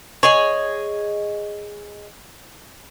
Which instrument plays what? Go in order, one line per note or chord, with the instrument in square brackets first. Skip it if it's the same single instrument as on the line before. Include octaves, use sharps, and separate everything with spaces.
[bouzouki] G#4 D#5 G#5 [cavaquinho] C#5